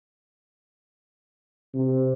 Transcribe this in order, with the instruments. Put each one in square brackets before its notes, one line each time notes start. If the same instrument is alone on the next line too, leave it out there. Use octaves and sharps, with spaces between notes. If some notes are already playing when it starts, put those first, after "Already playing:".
[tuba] C3